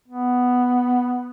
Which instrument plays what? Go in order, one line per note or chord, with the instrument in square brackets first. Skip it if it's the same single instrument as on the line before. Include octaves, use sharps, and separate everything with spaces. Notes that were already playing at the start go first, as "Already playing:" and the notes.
[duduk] B3